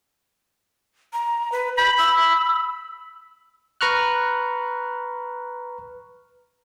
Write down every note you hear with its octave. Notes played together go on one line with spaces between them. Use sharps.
A#5
B4
B5 G6
E6
B4 A#5 C#6 F6 F#6